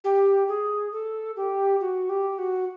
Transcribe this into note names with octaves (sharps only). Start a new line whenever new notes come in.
G4
G#4
A4
G4
F#4
G4
F#4